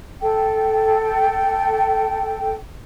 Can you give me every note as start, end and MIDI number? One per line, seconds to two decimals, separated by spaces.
0.21 2.55 69
0.21 2.55 79